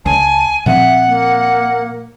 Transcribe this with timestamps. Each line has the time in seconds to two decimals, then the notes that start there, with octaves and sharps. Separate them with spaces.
0.06 C#2 G#5 A5
0.66 A#2 F3 C4 E5 F#5
1.07 A#3